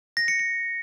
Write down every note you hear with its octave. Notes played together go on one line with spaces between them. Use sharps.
A#6
C#7
C#7